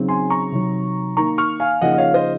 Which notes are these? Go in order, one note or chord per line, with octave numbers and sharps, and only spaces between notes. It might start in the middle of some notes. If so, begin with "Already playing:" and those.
Already playing: C#3 F#3 C4 D#4
G#5 C6
A#5 C#6
C3 D#3 F#3
D#3 A#3 D#4 A#5 C#6
C#6 F6
F5 G#5
C#3 F3 A#3 D#4 D#5 F#5
D#5
C#5 F5
C5 D#5